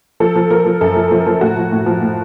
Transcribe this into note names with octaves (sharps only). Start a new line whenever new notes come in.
F3 A4
F3
F3 A#4
F3
F#2 A4
F3
F3
F3
A2 F#4
F3
A2
F3
A2